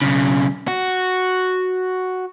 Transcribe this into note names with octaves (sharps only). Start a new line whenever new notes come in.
B1 C#3
F#4